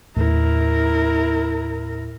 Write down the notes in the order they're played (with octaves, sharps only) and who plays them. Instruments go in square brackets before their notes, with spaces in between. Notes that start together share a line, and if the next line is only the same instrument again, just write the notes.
[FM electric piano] D#2 A2 [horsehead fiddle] E4 A#4